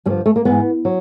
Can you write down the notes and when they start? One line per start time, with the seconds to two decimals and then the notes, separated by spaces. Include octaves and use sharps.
0.06 G2 D3 F3 G3
0.26 A3
0.36 A#3
0.45 G#2 E3 B3
0.85 F#3